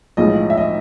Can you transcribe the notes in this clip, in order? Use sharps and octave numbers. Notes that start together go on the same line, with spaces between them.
B1 A2 F3 G#3 D#5
E5
D#5